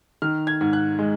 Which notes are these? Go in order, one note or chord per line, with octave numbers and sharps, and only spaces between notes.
D#3 F6
G#6
G#2
F#6
G#3